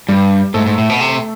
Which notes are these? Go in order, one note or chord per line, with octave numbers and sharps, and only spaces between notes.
G2 G3 G4
G#2 A3 A4
G#2
A2
B2
C3